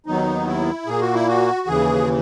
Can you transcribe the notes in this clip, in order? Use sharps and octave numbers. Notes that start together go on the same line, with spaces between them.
D#2 D#3 F#3 B3 D#4
E4
A#2 A#3 G#4
F#4
E4
F#4
D#2 C#3 E3 G#4